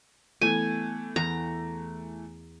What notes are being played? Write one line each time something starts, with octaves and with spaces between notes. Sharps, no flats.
E3 A3 B3 G#5
E2 A#5